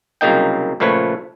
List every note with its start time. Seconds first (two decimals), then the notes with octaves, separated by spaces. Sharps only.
0.21 C2 F#2 C#3 A#3 D#4 G5
0.80 C#2 A#2 F3 A3 B4 C#5